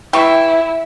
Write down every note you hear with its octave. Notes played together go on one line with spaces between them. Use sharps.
E3 E4 G5 C#6